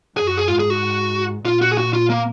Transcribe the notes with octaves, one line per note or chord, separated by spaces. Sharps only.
F#2 G#4
F#4
G#4
G#2 F4
G#4
F#4
A#2 F4
F#4
G#4
F#4
F4
A#3